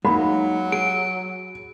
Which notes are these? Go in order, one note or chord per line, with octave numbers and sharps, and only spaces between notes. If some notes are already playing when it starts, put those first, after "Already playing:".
F#3 G#3 A#3 D#4 B5
G#4 D7